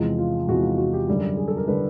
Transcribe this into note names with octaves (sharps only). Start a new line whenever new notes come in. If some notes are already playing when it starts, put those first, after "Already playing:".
Already playing: E2 C3 F3 G#3
F4
E2 C3 F3 G#3 F#4
F4
F#4
G4
F#2 D3 G3 G#4
G#4
A4
A#4
D3 G3 B4